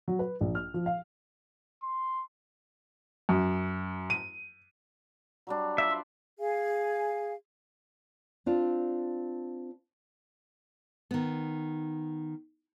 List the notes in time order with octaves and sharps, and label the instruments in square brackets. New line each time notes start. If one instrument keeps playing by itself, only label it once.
[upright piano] F#3
B4
A#1
F6
F3
F5
[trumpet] C6
[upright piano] F#2
D#7
[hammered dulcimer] F#3 G3 D4
[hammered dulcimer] F4 B4 D5 [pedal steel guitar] E5
[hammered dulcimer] C5
[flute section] G#4 F5 G#5
[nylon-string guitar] C4 D4 F4
D#3 B3